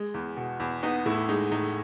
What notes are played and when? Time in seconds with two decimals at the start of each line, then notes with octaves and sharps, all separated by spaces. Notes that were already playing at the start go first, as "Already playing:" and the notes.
Already playing: G#3
0.14 E2
0.37 B2
0.60 E2
0.83 B3 D#4
1.06 A2 E4
1.28 G#3 D#4
1.51 A2 D#4